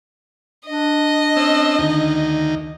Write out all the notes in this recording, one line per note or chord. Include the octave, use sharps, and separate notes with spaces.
D4 D#5
C4 C#4 E6
D2 D#3 D#4